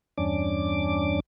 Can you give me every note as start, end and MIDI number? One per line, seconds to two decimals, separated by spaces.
0.18 1.20 40
0.18 1.20 43
0.18 1.20 61
0.18 1.20 62
0.18 1.20 86